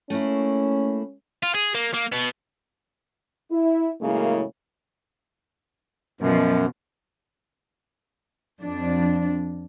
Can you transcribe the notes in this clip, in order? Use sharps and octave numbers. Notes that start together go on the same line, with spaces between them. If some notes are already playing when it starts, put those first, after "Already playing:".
A3 A#3 C#4 E4
F4
G#4
A#3
A#3
B2 B3
E4
F#2 A2 C#3 G#3 A#3 E4
F#2 B2 F3
F2 D4